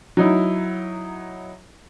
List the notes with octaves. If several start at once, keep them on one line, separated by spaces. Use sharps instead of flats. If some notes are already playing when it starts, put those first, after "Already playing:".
F#3 D#4 E4